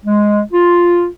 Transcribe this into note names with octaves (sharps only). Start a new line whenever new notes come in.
G#3
F4